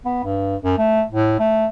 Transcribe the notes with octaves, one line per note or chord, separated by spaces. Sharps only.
B3
G2
F#2
A3
A2
A3